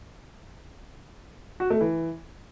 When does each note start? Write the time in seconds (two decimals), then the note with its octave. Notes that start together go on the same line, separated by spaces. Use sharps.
1.60 F#4
1.70 A3
1.81 E3